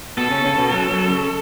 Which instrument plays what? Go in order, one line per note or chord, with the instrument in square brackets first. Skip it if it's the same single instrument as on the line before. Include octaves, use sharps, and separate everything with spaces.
[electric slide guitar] B2 B3 [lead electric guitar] A4
[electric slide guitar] C#3 C#4
C#3 C#4
B2 B3
F#2 F#3
F#2 F#3
C#3